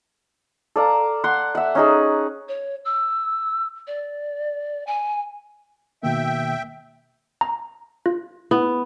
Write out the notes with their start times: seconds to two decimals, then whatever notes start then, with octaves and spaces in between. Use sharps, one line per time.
0.76 A4 D5 F5 A#5
1.24 F#5 C6
1.55 E5 F#5
1.75 C#4 D#4 G#4
2.49 C#5
2.85 E6
3.87 D5
4.87 G#5
6.03 B2 D#3 A#3 E5 G5
7.41 A#5
8.06 F4
8.51 B3 E4